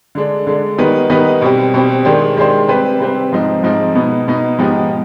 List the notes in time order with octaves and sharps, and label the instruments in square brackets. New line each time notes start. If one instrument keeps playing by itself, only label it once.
[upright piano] D3 G#3 D4
D3 G#3 D4
D#3 G3 B3 D#4 B4
D#3 G3 B3 D#4 B4
B2 G3 C4 G4
B2 G3 C4 G4
D#3 G#3 D4 G4 C5
D#3 G#3 D4 G4 C5
C3 G3 C4 G4 B4
C3 G3 C4 G4 B4
G#2 F3 C4 D#4
G#2 F3 C4 D#4
B2 B3 D#4
B2 B3 D#4
G#2 F3 B3 D#4 G4